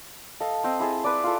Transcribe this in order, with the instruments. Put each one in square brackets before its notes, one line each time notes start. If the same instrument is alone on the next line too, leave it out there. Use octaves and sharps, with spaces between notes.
[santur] A4 D#5 F5
C4 C5 D#5
E4 G#4 A5
B4 D5
F4 A4